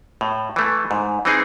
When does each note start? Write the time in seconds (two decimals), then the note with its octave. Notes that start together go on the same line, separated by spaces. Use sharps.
0.21 A2
0.56 E3 A3
0.91 G#2
1.25 E3 C4 D#4 G#4